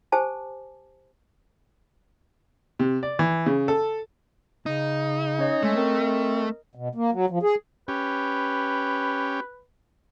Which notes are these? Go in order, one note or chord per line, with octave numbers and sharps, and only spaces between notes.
G4 C5 G#5 A5 D6
C3
D5
E3
C#3
A4
C#3 D#4
C#4 C#5 D#5
G#3 A3
C4 A#4 D#5
B2
A#3
F#3
F3
G#4
C#4 G4 B4